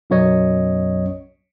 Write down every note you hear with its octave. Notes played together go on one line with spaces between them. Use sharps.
B1 F#2 F#3 C#5 D#5